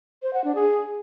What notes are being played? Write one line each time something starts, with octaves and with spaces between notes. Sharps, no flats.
C5
F#5
D4
G#4